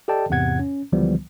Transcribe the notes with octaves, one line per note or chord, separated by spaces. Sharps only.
G4 A4 D5 D#5 G5 A5
E2 G#2 C3 F#5 G#6
C#4
C#2 D3 E3 F3 G3 B3